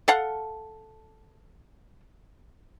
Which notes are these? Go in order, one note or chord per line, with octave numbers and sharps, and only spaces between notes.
A4 F5 F#5